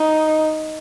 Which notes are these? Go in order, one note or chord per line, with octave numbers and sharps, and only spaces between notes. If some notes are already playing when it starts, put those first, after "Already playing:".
Already playing: D#4